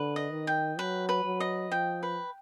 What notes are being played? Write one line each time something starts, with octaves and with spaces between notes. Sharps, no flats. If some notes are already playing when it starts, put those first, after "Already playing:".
Already playing: D3 B4
D#5
D#3
G5
F#3 B4
B4
F#3
D#5
F3 G5
B4